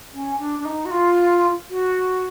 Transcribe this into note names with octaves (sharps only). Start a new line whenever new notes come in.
C#4
D4
D4
D#4
F#4
F4
F#4